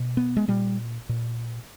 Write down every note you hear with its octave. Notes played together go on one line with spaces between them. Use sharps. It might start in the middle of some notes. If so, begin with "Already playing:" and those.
Already playing: B2
B3
G#3
A#2 G3
A#2